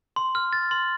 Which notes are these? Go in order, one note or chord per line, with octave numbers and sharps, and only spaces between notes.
C6
F6
A6
C6